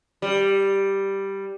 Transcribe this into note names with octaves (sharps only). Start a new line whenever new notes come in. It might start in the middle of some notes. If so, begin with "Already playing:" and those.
G3